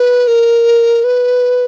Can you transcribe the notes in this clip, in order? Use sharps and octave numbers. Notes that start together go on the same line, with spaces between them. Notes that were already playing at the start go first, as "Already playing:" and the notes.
Already playing: B4
A#4
B4